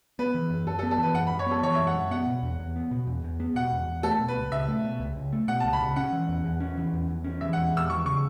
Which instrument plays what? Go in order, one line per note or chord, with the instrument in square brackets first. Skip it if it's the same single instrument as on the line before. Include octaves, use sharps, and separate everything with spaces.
[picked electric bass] B3 [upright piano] B4
[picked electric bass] E3
F#2
[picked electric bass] F#2 [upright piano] A4
[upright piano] A4
[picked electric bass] B3
[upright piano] A4
[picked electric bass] E3 [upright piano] B4
[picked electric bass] F#2 [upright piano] F#5
[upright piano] B5
[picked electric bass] F#2
[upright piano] C#5
[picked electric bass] B3 [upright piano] A4
[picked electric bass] E3 [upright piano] C#5
[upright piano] E5
[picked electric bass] F#2
[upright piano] F#5
[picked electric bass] F#2
[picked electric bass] B3 [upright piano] F#5
[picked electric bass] B2
E2
E2
B3
B2
E2
E2
B3
[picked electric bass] B2 [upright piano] F#5
[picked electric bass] E2
E2
[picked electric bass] A3 [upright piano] A4
[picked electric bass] B2
[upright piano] B4
[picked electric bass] C#2
[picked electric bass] C#2 [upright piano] E5
[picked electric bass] A3
B2
C#2
C#2
A3
[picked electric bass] B2 [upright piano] F#5
[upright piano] A5
[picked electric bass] C#2
[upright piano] B5
[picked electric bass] C#2
[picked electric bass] C#4 [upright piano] F#5
[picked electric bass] E3
E2
E2
C#4
E3
E2
E2
C#4
[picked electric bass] E3 [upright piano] E5
[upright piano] F#5
[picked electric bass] E2
[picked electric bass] E2 [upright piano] E6
[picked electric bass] E3 [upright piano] C#6
[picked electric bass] C#3 [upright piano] C#6